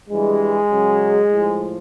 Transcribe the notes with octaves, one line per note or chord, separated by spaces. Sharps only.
G2 E3 G3 G#3
F#2 C#3 F#3
A2 F3